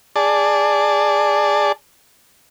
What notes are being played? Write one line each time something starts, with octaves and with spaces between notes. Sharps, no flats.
G#4 D5 A5